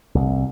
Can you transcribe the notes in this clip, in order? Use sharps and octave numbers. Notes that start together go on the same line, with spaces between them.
C2